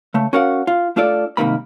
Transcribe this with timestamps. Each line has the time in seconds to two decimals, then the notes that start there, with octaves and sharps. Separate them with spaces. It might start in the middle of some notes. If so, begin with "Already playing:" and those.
0.14 C#3 A3
0.33 C#4 F#4 A#4 F5 F#5
0.67 F4
0.96 A3 D4 F4 A4 D5
1.37 C2 G#2 C3 D#3 A#3 B5